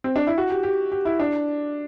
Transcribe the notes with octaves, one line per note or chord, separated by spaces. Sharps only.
C4
D4
E4
F#4
G4
G4
G4
E4
D4